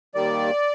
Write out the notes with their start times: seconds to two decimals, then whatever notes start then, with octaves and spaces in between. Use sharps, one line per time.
0.15 D#2 D#3 G3 D5